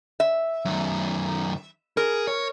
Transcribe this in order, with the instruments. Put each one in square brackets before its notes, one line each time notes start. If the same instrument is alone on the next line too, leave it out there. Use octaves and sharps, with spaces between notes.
[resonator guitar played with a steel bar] E5
[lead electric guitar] F#2 D#3
[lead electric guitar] G#4 [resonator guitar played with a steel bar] A#4
[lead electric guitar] C#5